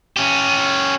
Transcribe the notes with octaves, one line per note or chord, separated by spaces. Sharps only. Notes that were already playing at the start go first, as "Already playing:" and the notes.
C#4 G4